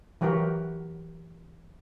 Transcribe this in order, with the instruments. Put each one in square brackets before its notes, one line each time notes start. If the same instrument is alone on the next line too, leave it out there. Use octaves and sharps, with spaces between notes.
[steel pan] E3 F#3 F#4 G4 A#4